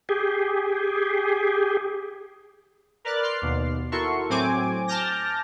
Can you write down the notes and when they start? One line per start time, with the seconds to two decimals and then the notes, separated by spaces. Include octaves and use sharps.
0.09 G4 G#4
3.05 A#4 B4 D5 F6 F#6 A6
3.23 C6 D6 F6 C7
3.42 D#2 B2
3.92 E4 F#4 A4 A#4 C6 C#6
4.29 A2 F#3 C4 G#5 D6
4.88 A5 D6 F6 G6 A#6